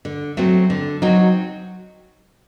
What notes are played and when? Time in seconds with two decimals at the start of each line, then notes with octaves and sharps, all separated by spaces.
0.05 D3
0.37 F#3 A3 C4
0.70 D3
1.02 F#3 C4 D#4 F#4